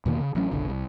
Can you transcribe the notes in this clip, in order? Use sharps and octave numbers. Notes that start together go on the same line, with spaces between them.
E2 B2 D#3 A#3
C#3
A1 F#3 C#4
F#1 B1 D3
C2